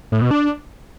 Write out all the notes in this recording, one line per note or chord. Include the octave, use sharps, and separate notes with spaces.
A2
B2
D4